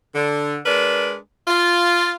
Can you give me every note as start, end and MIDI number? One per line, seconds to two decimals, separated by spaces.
0.15 0.56 50
0.66 1.16 56
0.66 1.16 62
0.66 1.16 70
0.66 1.16 71
1.47 2.13 65